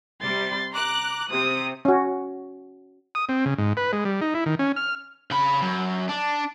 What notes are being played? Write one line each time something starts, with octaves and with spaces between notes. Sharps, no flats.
C3 G3 C6 A6
A#5 D6 F#6
C3 D#6
C#4 F#4
D#6
C4
C#3
G#2
B4
G#3
G3
D#4
E4
D#3
C#4
F6
C#3 B5
F#2
D4